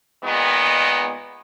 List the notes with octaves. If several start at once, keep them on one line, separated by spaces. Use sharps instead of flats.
A#2 D#3 G#3 B3